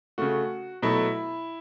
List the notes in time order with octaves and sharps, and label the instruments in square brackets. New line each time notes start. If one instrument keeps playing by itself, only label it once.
[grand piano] C#3 A3 F#4
B2 F#3 A3 E4